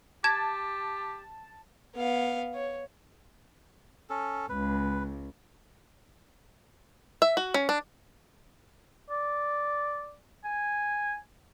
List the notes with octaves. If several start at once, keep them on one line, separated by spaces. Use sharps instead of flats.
G4 A5 G#6
B3 F5
C#5
C#4 A4
C#2 B4
E5
F#4
C#4
D4
D5
G#5